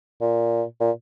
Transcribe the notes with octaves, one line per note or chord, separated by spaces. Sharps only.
A#2
A#2